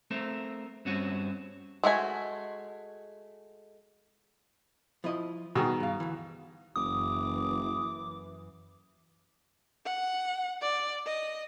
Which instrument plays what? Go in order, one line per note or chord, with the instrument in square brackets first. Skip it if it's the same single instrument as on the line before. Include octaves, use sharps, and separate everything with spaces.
[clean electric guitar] A3 C4 A#4
G2 C4 C#4 F#4
[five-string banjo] G#3 A3 F#4 G#5
[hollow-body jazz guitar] F3 E4 D#5
[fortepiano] B2 D#3 [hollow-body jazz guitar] B3 F#4 G#4
[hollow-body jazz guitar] G2 F5
D2 E3
[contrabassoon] F#1 [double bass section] F#2 E3 [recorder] D6 [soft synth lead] D#6
[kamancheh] F#5
D5
D#5